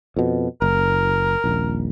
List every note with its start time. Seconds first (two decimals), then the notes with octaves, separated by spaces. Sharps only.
0.17 F2 B2
0.62 F#1 A#4
1.44 D#1 A#1